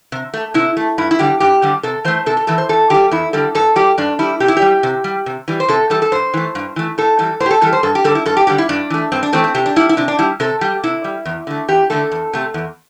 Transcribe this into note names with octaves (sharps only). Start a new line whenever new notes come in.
C3
A3
C3 E4
A3
G2 E4
E4
D3 G3 G4
G2 G4
D3 G3
C3 A4
E3 A3 C5
C3 A4
A4
E3 A3 A4
C5
E2 A4
D3 G3 G4
E2 E4
D3 G3 A4
G2 A4
G3 G4
G2 D4
G3 E4
C3 G4
E4
G4
G3
C3
G3
C3
E3 G3
C5
C3 A4
E3 G3 A4
A4
G2 C5
E3 A3
G2
E3 A3
A2 A4
E3 G3 A4
A2 C5
G4
A4
E3 G3 A4
C5
G2 A4
G4
D3 G3 A4
E4
G2 A4
G4
D3 G3 G4
E4
G2 D4
E3 A3
G2 C4
D4
E3 A3 C4
C4
C3 G4
D4
G3 E4
E4
C3 D4
D4
G3 E4
C3 A4
G3 G4
C3 E4
G3
E2
D3 A3
E2 G4
D3 A3 A4
E2
C3 A3
E2